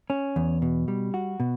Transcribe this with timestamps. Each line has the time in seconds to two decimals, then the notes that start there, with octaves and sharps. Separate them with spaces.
0.10 C#4
0.36 E2
0.62 B2
0.88 G3
1.14 F#4
1.40 B2